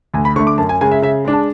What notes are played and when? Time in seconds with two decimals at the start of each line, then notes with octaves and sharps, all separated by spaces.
0.14 D2 G#5
0.25 B5
0.36 D3 C#6
0.39 A3
0.47 D6
0.58 F#2 A5
0.69 G#5
0.81 C#3 G#3 G#5
0.91 E5
1.02 C#3 E5
1.25 G#3 D4
1.33 A5